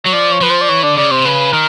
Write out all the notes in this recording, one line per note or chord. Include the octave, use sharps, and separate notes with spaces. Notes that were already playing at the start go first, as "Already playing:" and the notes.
F#3 C#5
F3 D5
C#5
F3 B4
C5
D5
E3 C#5
D3 D5
C#3 D5
C3 C5
C#3 B4
D#3 A#4